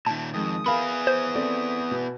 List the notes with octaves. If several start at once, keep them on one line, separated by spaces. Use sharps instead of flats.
A#2 D#3 A5
F2 D#3 G#3 D#6
B3 G#4 A#4 F5 B5
C5
C4 A4 D5
B2